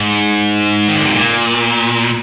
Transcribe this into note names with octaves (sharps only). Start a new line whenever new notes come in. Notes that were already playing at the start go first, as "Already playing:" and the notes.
Already playing: G#2
D#3
D3
C3
A#2